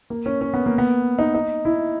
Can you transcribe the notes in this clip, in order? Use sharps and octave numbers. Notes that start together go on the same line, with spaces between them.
A#3
C#4
C#4
B3
A#3
B3
D#4
D#4
E4